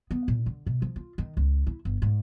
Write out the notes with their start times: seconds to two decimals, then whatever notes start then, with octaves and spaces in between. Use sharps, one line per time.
0.11 B3
0.28 A#2
0.46 D3
0.66 B2
0.82 F3
0.96 F4
1.18 D#3
1.37 C#2
1.67 E4
1.85 G1
2.02 G#2